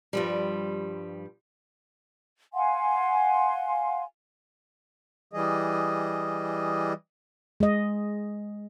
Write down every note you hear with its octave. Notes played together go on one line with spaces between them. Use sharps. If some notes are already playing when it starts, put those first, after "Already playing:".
G2 F3 G3
F5 F#5 G#5 C6
E3 G3 G#4 D#5
G#3 D#5